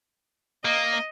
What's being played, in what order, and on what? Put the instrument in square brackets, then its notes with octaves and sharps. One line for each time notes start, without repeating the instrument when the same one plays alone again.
[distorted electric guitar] A#3 [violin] D#5